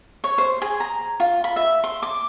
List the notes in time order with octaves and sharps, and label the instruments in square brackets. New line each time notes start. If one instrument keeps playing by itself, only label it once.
[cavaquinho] C#5
C5
G#4
A#5
F4
B5
E5
C6
D6